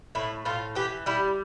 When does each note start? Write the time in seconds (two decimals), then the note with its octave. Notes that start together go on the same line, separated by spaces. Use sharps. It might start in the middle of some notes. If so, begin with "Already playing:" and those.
0.15 A2 E4
0.45 A2 F4
0.75 E3 G4
1.06 G3 E4